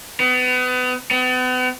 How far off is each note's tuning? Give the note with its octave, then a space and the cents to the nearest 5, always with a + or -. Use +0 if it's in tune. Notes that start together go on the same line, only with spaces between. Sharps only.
B3 +30
B3 +40